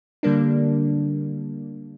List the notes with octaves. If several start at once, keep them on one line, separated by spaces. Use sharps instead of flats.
D3 G3 A#3 D4